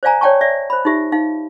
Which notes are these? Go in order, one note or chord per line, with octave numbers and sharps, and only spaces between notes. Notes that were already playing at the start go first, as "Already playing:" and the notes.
C5 D5 F5 G#5 A#5
C#5 D5 G5 A5 C#6
D5 E5
C5 B5
D#4 F4 G4 E5
D#4 F5